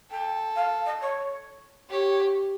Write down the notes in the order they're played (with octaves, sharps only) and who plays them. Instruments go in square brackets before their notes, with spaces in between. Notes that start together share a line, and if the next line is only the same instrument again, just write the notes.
[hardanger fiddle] A4 [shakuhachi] G5
[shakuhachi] F5
D#5
C#5
[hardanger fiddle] G4 [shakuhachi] C#5